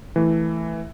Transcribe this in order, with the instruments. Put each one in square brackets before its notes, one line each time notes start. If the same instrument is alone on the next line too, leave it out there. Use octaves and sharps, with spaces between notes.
[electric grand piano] E3 A3